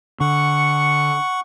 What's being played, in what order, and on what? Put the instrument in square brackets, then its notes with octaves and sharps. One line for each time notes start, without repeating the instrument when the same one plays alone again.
[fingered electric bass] D3 [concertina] F#5 C#6